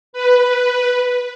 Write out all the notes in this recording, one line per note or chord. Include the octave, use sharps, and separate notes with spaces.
B4